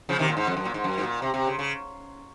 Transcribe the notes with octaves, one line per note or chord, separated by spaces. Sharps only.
C#3 F3
C3 D#3
A#2
G#2
F2
F#2
A#2
G#2
F#2
G#2
A#2
C3
C3
C#3
C#3